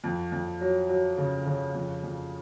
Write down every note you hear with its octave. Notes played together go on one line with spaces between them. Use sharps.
F2
F2
F#3
F#3
C#3
C#3
F2
F2